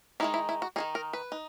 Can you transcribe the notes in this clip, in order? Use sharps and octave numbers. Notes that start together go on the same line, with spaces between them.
D#3 G#3 D#4 E4
E4
E4
F#4
D#3 G#3 D#4 G#4
A#4
B4
D#4